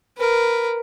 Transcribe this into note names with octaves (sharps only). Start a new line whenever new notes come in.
A#4 B4